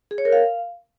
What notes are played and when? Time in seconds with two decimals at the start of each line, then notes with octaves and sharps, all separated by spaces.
0.11 G#4
0.18 C#5
0.25 A#4
0.32 F5